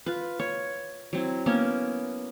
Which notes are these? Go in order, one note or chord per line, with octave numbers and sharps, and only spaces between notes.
F4 B4
C#5
F#3 C4 E4
A#3 B3 C#4 A#4